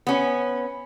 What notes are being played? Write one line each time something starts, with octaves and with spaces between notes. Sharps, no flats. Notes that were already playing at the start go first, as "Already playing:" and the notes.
B3 C#4